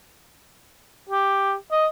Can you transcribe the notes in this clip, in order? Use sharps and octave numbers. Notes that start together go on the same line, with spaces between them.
G4
D#5